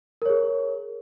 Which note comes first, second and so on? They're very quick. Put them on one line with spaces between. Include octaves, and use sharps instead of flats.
A#4 C#5 G#4